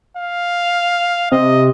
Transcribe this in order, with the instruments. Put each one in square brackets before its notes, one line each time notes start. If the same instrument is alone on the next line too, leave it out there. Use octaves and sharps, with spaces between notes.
[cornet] F5
[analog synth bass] C3 [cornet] D#5